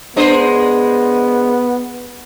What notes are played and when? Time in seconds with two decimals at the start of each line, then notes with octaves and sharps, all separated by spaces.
0.16 G#3 B3 D4 C5